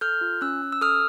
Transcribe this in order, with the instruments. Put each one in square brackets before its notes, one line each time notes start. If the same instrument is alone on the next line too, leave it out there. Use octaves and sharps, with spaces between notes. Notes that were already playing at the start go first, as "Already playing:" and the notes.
[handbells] A4 F6 G6
F4
C#4 E6 F#6
C#4
E6
A4 D#6 F6